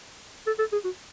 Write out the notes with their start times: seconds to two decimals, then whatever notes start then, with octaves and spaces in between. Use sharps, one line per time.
0.47 A4
0.59 A4
0.72 G#4
0.85 F#4